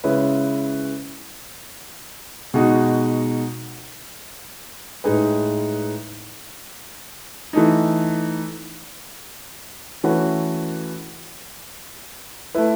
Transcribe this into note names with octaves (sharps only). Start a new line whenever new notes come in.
C#3 G#3 C#4 E4 B4
B2 G#3 D#4 F#4
A2 G#3 D#4 G#4 B4
E3 A3 D#4
E3 A3 C#4 F#4 B4
A3 E4 B4